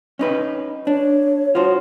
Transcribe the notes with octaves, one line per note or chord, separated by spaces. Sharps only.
C#4 D#4 B4
D4 C#5
F4 F#4 C5